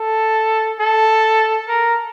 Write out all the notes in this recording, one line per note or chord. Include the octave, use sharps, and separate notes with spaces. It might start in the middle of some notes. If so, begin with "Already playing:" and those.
Already playing: A4
A4
A#4